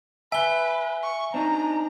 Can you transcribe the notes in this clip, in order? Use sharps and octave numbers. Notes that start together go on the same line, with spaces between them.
B4 E5 G#5 G7
C#6
C4 D4 D#4 A#5